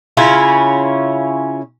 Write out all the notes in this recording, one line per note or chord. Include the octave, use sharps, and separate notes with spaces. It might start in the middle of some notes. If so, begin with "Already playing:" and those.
C#3 C#4 E4 F4